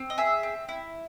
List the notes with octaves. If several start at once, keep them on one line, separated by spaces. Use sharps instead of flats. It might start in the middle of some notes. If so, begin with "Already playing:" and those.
Already playing: C4
D#5
G#4 E5
C4
E4